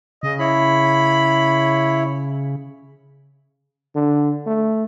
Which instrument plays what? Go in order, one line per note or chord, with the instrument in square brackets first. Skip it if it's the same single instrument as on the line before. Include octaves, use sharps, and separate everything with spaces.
[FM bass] C#3 [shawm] D#5
[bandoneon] E4 C#5 [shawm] B5
[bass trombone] D3
A3